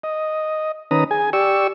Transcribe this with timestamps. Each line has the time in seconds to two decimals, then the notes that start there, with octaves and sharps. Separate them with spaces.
0.03 D#5
0.91 D#3 C#4 B4 A#5 D#6
1.11 G#4 G#5
1.33 G4 D5 C#6 E6